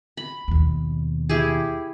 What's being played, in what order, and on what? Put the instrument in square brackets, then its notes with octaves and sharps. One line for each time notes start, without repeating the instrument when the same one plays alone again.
[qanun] B5
[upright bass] D#2 B2
[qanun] E4 G4 G#4